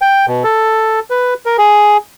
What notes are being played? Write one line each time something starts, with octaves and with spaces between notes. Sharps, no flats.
G5
B2
A4
B4
A#4
G#4